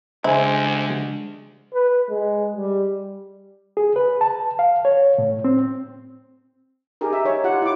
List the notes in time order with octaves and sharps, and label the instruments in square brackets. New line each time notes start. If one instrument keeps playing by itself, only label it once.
[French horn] D2 [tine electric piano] C#3 G#3 D4 [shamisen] E4 [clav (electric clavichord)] C5 G#5
[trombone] B4
G#3
G3
[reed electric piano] G#4
B4
A5
F5
C#5
A2
C4
[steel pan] D#4 G4 G#4 A#4
E5
D#4 C#5
F4 G4 F#5
E4 D6